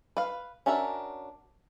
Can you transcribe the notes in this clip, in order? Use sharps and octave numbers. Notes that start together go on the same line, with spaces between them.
B4 F5
C#4 D4 F#4 A#4 E5